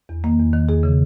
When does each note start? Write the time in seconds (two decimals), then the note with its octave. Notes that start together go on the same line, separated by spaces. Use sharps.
0.09 E2
0.24 D#3 A#3
0.39 E2
0.53 D#3
0.69 E2 G#4
0.83 C#3 E3